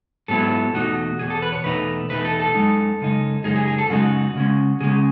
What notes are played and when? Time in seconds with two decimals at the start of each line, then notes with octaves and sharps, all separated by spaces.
0.28 G#2 F#3 B3 E4 A4
0.74 E2 B2 A3 D#4 F#4
1.19 E2 B2 G#4
1.30 A4
1.42 B4
1.52 C#5
1.64 E2 B2 A3 D#4 B4
2.10 E2 B2 A3 D#4 B4
2.25 A4
2.40 A4
2.55 F#2 C#3 G#3 D#4
3.00 F#2 C#3 G#3 D#4
3.44 F#2 C#3 G#3 D#4 G#4
3.56 G#4
3.68 G#4
3.78 A4
3.90 F#2 C#3 G#3 D#4 F#4
4.36 C#3 G#3 C#4
4.81 C#3 G#3 C#4 G#4